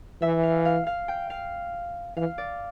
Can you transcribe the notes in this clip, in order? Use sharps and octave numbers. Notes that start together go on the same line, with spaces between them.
E3 E5
F5
F5
F5
G5
F5
E3 F5
D5